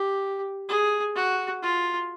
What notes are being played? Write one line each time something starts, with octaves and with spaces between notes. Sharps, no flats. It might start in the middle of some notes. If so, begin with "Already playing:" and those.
Already playing: G4
G#4
F#4
F4